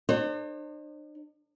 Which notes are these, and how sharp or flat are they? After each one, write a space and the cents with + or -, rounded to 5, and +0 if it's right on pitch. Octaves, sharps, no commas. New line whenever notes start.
D4 +45 C5 +40